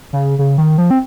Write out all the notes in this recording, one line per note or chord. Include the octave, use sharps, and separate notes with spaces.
C#3
C#3
D#3
F3
C4